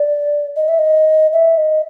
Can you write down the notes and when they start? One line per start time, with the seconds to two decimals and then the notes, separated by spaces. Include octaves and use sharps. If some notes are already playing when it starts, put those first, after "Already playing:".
Already playing: D5
0.56 D#5
0.68 E5
0.79 D#5
1.33 E5
1.58 D#5